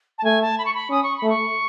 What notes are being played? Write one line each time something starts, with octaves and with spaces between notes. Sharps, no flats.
A5
A3 G#5
A5
B5
C#6
B5
C#4 D#6
C#6
B5
A3
C#6